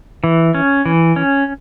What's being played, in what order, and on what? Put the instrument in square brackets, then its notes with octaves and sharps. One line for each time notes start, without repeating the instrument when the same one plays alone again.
[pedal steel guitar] E3
C#4
E3
C#4